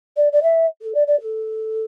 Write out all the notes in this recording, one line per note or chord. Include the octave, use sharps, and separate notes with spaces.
D5
D5
E5
A4
D5
D5
A4